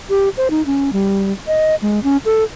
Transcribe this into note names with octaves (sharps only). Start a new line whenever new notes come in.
G4
C5
D#4
C#4
G3
D#5
G#3
C#4
A4